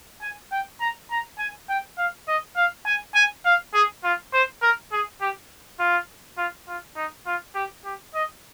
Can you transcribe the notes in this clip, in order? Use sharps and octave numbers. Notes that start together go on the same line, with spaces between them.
G#5
G5
A#5
A#5
G#5
G5
F5
D#5
F5
G#5
G#5
F5
G#4
F4
C5
A#4
G#4
G4
F4
F4
F4
D#4
F4
G4
G4
D#5